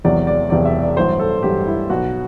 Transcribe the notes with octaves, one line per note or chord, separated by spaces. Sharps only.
E1 E2 C3 F#3 D5
D5
E1 E2 C3 F#3 D5
E5
D5
A1 G2 F#3 C5
A4
A1 G2 F#3 G4
E4
B1 B2 F#3 F#4